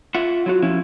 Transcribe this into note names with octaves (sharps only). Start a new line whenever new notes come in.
F4 E5 F#5
F#3 F4 F#4
F3 C#4 E4